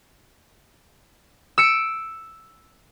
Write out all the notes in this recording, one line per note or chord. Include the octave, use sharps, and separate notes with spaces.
E6 C#7 D7